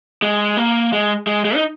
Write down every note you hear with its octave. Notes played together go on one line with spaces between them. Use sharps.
G#3
A#3
G#3
G#3
G#3
D#4